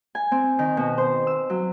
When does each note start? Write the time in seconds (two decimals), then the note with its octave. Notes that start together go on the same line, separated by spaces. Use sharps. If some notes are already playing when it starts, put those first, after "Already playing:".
0.15 G#5
0.32 C4
0.59 D#3
0.77 B2
0.98 C5
1.27 E6
1.50 F#3